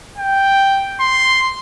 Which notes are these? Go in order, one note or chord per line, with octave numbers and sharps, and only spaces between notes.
G5
C6